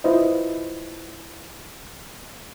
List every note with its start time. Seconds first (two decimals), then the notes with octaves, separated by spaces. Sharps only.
0.04 E4 F4 B4 C5 D#5